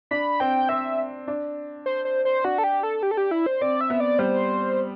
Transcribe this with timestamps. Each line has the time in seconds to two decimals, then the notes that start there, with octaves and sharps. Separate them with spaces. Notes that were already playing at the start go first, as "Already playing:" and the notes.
0.11 D4 B5
0.40 C4 G5
0.69 C4 E5
1.28 D4
1.86 C5
2.05 C5
2.25 C5
2.44 D4 F#4
2.58 A4
2.64 G4
2.83 A4
3.03 G4
3.11 A4
3.17 G4
3.31 E4
3.46 C5
3.61 C4 D5
3.81 E5
3.90 B3
4.00 D5
4.19 G3 C5